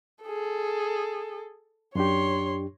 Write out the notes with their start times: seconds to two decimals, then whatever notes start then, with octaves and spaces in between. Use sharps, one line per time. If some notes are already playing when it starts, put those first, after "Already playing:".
0.23 G#4 A4
1.95 F#2 D4 G4 C#5 C6